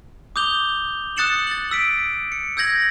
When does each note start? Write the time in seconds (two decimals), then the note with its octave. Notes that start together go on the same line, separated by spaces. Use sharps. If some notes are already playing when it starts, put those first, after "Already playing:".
0.36 D6 D#6 G6 F7 G7
1.16 D#6 F#6 A6 C#7 E7 F#7
1.47 A6 F#7
1.71 E6 B6 D7
2.32 C#7
2.57 E6 G6 G#6 A#6 F#7